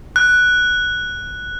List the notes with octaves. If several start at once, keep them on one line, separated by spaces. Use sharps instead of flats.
F#6